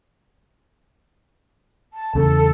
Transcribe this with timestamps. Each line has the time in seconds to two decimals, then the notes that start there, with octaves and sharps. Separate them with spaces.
1.93 A5
2.15 E2 C#3 A4